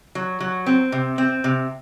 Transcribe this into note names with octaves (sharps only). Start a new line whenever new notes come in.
F#3
F#3
C4
C3
C4
C3